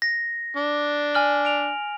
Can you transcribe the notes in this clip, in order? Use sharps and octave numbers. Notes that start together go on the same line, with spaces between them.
A#6
D4
G#5 F6 F#7
D7 F7